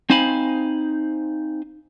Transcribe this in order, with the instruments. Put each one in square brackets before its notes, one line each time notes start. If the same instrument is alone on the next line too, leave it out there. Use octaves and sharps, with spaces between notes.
[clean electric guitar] C4 D#4 C5 F5 G#5 B5